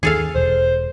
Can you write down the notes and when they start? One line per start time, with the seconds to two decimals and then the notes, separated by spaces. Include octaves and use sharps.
0.03 D#2 D#3 G#4 A4 F5
0.36 E1 C5